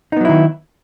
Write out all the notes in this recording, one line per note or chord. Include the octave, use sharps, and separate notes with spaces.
D#3 F#3 B3 D#4 E4